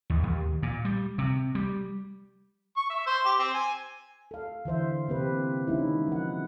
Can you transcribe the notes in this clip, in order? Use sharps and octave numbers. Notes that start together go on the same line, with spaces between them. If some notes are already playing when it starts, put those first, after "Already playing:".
D#2
D#2
A#2
G3
C3
G3
C#6
E5
C5
G4
C4
G#5
A4 F5
D3 E3 C5 E5
C3 A#3 C4 G4 B4
D#3 G#3 A#3 C#4 D#4 E4
F3 F#5